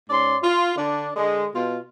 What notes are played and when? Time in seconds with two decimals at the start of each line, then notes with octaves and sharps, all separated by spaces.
0.10 G#2 C#4 D5 C6
0.42 F4
0.76 D3 D4
1.16 D3 G#3
1.55 B2 F4